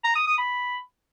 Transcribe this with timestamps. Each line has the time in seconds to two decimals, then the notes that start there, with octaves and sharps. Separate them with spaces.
0.04 A#5
0.16 D#6
0.27 D#6
0.38 B5